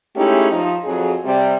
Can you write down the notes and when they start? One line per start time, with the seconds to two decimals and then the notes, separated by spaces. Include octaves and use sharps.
0.16 G#3 A3 C#4 D#4 E4 G4
0.51 F3 D#4
0.85 F2 F#3 G#4
1.25 C3 G3